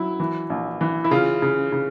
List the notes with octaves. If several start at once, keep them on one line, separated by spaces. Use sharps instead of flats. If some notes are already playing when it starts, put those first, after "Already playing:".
Already playing: F#3 E4
E3
A#1
E3
E4
C#3 F4
C#3
C#3